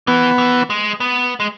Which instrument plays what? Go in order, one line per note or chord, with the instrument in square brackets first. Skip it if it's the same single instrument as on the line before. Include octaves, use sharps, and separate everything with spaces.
[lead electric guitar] E3 [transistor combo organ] B3
[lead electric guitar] E3
G#3
B3
G#3